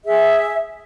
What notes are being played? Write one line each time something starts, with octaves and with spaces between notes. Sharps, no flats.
G#4 E5